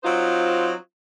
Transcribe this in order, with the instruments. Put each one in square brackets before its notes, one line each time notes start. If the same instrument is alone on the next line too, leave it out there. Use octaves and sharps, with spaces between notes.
[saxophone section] F#3 C4 D#4 F4 C5